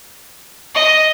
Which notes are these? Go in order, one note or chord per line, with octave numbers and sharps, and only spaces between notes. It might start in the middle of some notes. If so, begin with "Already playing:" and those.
D#5